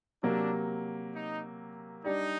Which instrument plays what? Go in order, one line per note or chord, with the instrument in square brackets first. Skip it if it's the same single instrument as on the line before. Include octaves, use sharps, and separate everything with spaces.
[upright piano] C3 F#3 A#3 [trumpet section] D4
[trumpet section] D#4
[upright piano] G3 D4 G4 D5 [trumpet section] D#4